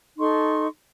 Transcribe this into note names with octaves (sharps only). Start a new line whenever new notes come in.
D#4 A4 C6 C#6